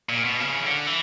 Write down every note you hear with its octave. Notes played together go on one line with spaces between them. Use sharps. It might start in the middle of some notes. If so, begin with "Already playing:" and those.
A#2
B2
C#3
E3
D3
E3